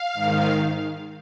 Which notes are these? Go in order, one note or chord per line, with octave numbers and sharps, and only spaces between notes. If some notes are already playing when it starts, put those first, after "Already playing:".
Already playing: F5
G#2 D#3